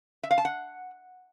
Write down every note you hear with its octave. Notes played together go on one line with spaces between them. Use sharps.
E5
F5
A5
F#5